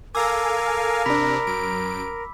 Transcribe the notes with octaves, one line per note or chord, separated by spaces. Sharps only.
A4 A#4 F5 G#5 D6 E6
C3 D4 B5 B6
F#2 D7